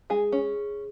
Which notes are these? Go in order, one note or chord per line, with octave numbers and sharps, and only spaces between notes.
G#3 G#4
C#4